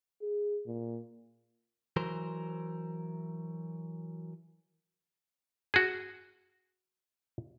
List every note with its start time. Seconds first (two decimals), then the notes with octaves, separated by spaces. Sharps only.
0.22 G#4
0.66 A#2
1.96 E3 F#3 A#4 C5
5.74 F#4 G#4